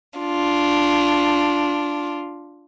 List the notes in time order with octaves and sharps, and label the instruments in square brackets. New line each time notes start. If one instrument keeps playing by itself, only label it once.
[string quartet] D4 F4